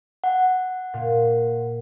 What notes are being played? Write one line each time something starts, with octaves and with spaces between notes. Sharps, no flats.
F#5
A#2